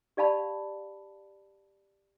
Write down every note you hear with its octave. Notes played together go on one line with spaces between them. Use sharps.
G4 D5 F5 A5 B5